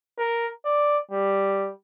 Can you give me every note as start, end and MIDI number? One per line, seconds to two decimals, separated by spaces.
0.18 0.47 70
0.65 0.98 74
1.11 1.71 55